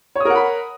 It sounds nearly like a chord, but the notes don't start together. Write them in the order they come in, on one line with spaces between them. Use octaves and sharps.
C#5 D#6 A#4 F#5 B5